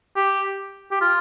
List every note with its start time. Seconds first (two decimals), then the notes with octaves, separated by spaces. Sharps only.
0.16 G4
0.91 G4
1.01 F4